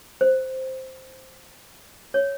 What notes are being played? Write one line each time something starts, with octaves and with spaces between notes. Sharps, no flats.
C5
C#5